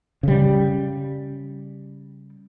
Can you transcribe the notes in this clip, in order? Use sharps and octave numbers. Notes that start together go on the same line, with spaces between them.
C#3 G3